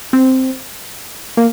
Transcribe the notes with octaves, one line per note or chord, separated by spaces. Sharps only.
C4
A#3